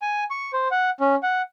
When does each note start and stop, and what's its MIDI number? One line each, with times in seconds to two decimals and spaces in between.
0.02 0.24 80
0.31 0.51 85
0.53 0.68 72
0.71 0.90 78
1.00 1.15 61
1.23 1.42 78